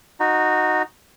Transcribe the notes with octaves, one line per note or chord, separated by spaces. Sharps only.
D#4 F#4